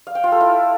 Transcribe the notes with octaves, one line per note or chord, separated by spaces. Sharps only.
F5
G5
F4
A4
E4